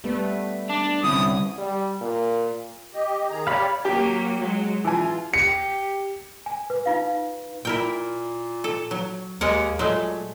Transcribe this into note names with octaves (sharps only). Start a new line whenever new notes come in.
G3 A3 B3 B4
D4
C2 D3 C#4 E4 D#6
G3
A#2
G4 D#5
D#3 G#4 A#5
G4 C#5 D5 F5 B5
F#3 A#3 G4
F#3 G#3
E3 F4 G#5
G4 C#7
G#5
B4
D#4 F4 F5
A#2 E4 A#4 G5
A4
F#3
D#2 G#3 A#4 F#5
A#2 F#3 G#3 A3